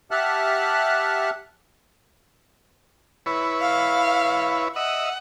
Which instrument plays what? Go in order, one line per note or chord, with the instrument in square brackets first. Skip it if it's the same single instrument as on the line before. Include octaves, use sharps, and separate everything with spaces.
[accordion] G4 E5 F#5 A5 F6 F#6
[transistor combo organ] E4 B4 C#5
[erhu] F5
[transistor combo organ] D#5 E5 [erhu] F#5